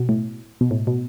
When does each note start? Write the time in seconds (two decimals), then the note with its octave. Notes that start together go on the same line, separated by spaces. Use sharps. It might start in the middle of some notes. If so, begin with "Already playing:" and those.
Already playing: B2
0.09 A2
0.61 B2
0.71 A2
0.87 B2